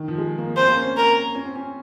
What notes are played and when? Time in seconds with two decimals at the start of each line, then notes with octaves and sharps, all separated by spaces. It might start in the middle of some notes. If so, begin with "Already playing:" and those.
Already playing: D#3
0.08 F3
0.18 G#3
0.38 A#3
0.57 C4 C5
0.68 A#3
0.76 C#4
0.97 A#4
1.35 C#4
1.45 C4
1.56 C#4